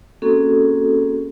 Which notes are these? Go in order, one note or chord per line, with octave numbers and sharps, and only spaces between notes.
A#3 C4 C#4 F#4 G#4 A4